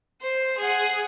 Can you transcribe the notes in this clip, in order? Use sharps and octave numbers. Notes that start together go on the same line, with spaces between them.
C5
G#4 F#5